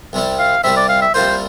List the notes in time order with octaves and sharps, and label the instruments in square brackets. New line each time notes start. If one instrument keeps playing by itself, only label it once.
[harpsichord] C2 C3 G3 C4
[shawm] F5
[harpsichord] C2 C3 G3 C4 [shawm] E5
[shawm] D5
F5
E5
[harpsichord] C2 C3 G3 A#3 F4 [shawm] C5